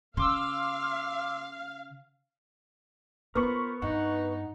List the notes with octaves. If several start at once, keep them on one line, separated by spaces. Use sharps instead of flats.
C#3 F5 C6 D6 E6
B3 F4 A#4 C5 B5 C#6
G2 D#4 F#5